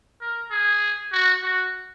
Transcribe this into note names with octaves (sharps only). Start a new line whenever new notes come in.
A#4
G#4
F#4
F#4